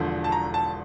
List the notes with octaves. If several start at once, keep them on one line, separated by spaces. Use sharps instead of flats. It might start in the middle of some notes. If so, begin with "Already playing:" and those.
Already playing: E1 E2 D3 F3
A5
A#5
A5